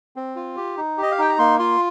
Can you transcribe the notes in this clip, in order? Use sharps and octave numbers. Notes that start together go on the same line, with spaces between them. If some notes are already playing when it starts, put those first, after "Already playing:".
C4
F4
G4
D#4
G4 D#5
F5
D#4 G5
A#5
A#3 C6
F4 C6